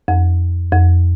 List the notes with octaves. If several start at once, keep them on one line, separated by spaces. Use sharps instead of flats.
F2
F2